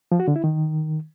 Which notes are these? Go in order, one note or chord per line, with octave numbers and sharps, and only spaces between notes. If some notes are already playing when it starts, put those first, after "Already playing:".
F3
F#4
D3
E4
D#3